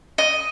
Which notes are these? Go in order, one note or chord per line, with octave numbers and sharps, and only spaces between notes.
D#5